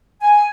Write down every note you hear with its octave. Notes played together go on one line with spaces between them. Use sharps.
G#5